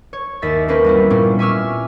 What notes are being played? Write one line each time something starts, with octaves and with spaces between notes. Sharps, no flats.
C#5
D#2 E5 A6 B6
A#3 C4 C#4 A#4 B4
G3 B3 E4
A#2 G3 C4 C#4
E5 G#5 C#6 D6 E6 F6